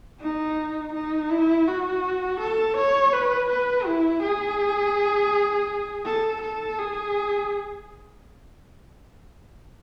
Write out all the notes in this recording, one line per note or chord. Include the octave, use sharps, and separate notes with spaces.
D#4
D#4
E4
F#4
A4
C#5
B4
B4
E4
G#4
A4
A4
G#4